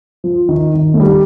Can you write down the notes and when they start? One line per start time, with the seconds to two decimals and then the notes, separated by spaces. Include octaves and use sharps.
0.24 F3
0.49 D#3
0.74 D#3
0.94 A3
1.00 G3